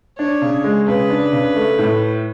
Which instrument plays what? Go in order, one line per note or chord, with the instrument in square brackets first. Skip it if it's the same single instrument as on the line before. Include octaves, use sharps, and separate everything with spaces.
[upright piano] D4 [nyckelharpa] C#5
[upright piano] C#3
G#3
[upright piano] C#3 [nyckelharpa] B4
[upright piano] D4
C#3
A3
A2